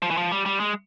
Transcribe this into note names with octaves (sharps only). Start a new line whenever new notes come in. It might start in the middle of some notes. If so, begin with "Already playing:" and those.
F3
E3
F3
G3
G3
G#3